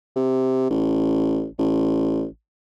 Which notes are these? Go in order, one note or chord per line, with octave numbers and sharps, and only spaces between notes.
C3
A1
A1